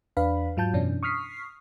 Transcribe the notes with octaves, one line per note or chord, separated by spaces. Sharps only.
E2 D4 B4 F5 B5
G#2 F#3 F4 A5 G6
F#2 B2 E3 C#4 D4
C#6 D#6 F6 B6 C7